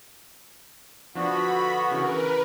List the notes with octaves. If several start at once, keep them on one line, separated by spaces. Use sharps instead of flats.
D3 F3 B3 D4 F#4 B5
C#3 E3 A#4 B4